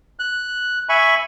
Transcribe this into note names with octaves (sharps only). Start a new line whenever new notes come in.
F#6
E5 G#5 B5 C#6